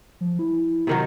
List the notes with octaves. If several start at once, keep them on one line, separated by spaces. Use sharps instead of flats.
F3
E4
C3 D#3 F#3